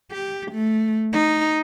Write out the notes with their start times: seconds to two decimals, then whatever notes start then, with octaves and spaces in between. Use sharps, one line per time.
0.12 G4
0.52 A3
1.13 D#4